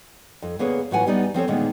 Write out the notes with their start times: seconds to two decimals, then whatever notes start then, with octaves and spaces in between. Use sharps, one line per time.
0.42 F2
0.59 D2 A#3 B3 G#4 B4 C#5
0.91 A2 E3 F#3 F4 F#5 G#5
1.07 G3 B3 D#4 D5
1.34 F3 C4 A4 C#5
1.48 A#2 D3 D#3 G#3 A#3 B3